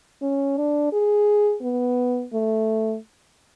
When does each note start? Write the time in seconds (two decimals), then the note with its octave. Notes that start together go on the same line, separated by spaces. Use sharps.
0.22 C#4
0.57 D4
0.92 G#4
1.62 B3
2.33 A3